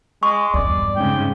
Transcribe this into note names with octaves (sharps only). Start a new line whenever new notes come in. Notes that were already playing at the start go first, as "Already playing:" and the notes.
G#3 C#6
E2 G2 D5
G#2 C#3 G5